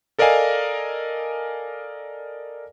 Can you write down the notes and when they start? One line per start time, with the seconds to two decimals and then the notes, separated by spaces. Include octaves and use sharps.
0.19 A4 A#4 D5 D#5 F5 G#5